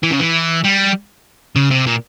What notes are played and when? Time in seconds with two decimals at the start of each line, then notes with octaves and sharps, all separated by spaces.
0.03 E3
0.11 C#3
0.19 E3
0.64 G3
1.56 C#3
1.71 C3
1.87 A#2